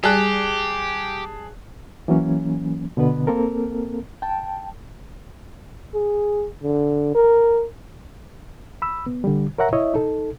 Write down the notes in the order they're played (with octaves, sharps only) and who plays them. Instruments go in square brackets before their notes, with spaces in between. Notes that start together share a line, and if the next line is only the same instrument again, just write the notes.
[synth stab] G3 [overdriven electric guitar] G4 [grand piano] G#4 A5 F#6
[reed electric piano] E3 F#3 A#3 C#4
B2 D3 B3 B4
A#3 C4 A4 A#4
G5 A5
[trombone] G#4
D3
A#4
[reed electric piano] B5 E6
B3
D3 G3
A#4 C#5 E5 F#5 A#5
E4 C#5 D#5 E5
D#4 A4